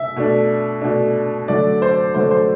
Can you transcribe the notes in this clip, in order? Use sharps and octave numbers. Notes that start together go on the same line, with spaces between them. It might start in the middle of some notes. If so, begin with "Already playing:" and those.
Already playing: E5
B2 A3 D4
B2 A3 D4
D3 F#3 A3 D5
C5
D3 F#3 A3 C5
C5